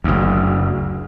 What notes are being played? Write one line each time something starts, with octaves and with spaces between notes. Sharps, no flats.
F#1 D2